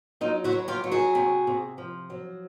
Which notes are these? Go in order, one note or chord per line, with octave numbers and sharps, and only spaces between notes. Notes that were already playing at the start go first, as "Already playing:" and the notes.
F#3 D#4 F4
E4 F#4
F#3
F4 G4
F#3
F#4 G#4
C3
C3
F3
F#3